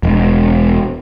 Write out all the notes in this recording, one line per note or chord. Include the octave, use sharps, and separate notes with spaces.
E1